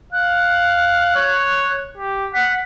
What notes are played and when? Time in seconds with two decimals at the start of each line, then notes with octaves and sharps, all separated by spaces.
0.13 F5 F#6
1.16 C#5
1.97 G4
2.34 F#5 B6